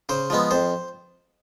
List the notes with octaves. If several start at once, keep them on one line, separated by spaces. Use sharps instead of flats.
C#3 C5
F3 G#3 B3
F2 C5